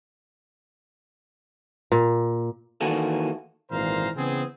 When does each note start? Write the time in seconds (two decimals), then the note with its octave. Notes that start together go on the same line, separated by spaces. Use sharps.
1.92 A#2
2.81 D#3 E3 A#3 F#4 G#4 A4
3.71 G#1 A#2 E3 C5 F5 A#5
4.17 C#3 E3 B3 C4 G#4